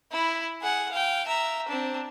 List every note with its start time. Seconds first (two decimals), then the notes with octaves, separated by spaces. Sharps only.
0.12 E4 B5
0.61 G#4 F#5
0.92 F5 G5
1.27 E5 A#5
1.68 C4 D4